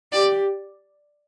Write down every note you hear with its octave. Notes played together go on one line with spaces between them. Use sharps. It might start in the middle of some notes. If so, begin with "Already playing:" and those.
G4 D5